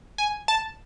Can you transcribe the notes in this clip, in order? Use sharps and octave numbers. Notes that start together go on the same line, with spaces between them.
G#5
A5